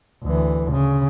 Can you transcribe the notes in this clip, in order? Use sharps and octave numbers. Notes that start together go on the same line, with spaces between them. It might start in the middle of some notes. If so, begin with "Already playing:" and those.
D2 E3
C#3